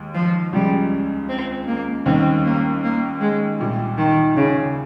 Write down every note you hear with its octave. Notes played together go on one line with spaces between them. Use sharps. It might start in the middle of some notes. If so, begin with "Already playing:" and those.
Already playing: D#2 G#3
F3
C#2 C#3 G3 G#3
C4
A#3
D#2 D#3 G3 C4 C#4
A#3
A#3
G#3
C2 A#2 G3
D#3
C#3